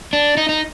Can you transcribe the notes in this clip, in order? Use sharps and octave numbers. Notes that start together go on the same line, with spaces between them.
D4
D#4
D#4